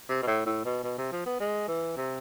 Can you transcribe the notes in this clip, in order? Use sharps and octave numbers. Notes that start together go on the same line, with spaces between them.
C3
B2
A2
A2
B2
B2
C3
F3
B3
G#3
E3
C3